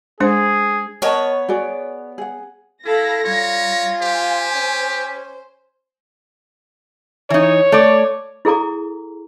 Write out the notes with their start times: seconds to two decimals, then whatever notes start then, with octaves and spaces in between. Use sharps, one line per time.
0.20 G#3 D4 G#4 C5
1.02 B3 A#4 C#5 D#5 A5
1.48 F#4 G#4 D5
2.18 G#4 F#5
2.85 E4 A4 F5 B5 A#6
3.24 G3 F4 C#5
4.02 G4 C5 G#5
4.55 C#4
7.30 E3 D#4 C#5
7.72 A3 D5
8.45 E4 G#4 A4 A#5 D6